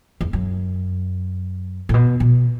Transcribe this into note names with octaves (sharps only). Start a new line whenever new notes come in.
E2
F#2
A2
B2
B2